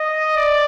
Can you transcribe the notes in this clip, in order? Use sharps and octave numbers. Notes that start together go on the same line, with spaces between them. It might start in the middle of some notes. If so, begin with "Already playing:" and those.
Already playing: D#5
D5